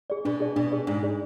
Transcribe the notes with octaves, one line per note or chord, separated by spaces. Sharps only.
G#4 D5
B2 D4
G#4 D5
B2 D4
G#4 D5
G#2 D4
G#4 D5